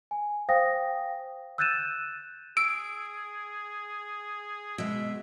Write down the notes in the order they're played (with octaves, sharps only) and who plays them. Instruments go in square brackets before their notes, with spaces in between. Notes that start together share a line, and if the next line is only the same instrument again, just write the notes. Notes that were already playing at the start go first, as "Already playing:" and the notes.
[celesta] G#5
C5 F5 G5 D#6 A#6
E6 F#6 G6 A6 D#7 E7
[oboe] G#4 [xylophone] E6 [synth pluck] D7
[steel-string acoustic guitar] B2 G#3 [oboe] E5